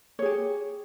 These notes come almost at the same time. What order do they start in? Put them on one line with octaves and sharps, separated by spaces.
C#5 G#4 G4